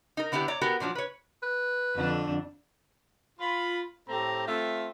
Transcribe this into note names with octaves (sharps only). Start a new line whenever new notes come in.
D#4 A#4
D3 B3 D4 E4 G4
C#5 D5 A#5
B3 F#4 G4 A#4
A#2 F3 F#3 D4
B4 C#5
B4
F2 D3 D4
F4 B5
A2 A3 C4 G4 A4 A#5
A3 C4 F4 E5